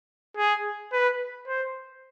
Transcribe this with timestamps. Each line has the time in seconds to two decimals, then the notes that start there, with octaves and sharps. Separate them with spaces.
0.37 G#4
0.93 B4
1.48 C5